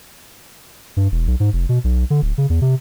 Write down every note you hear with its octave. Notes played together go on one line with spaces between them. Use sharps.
G2
E1
B1
G#2
F1
B2
B1
D3
D1
C#3
E2
C3